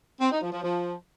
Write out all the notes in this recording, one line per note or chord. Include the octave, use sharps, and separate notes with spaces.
C4
D#4
F3
F3
F3